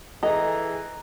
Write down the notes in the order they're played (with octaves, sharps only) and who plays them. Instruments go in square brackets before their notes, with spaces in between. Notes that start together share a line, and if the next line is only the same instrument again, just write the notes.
[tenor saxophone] E3 [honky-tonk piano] G#4 A4 [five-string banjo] D#5 [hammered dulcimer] A#5